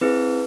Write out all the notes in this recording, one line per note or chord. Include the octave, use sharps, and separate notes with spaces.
C4 E4 G#4 B4